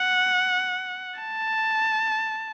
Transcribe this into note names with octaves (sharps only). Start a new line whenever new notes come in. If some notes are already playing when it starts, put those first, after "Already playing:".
Already playing: F#5
A5